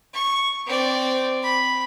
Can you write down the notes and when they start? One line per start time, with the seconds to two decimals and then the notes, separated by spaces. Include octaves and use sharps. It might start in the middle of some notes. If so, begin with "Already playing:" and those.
0.13 C#6
0.67 C4 D5
1.43 B5